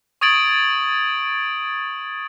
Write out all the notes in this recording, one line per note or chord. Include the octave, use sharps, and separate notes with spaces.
C#6 D#6 G#6 A6 D7 F#7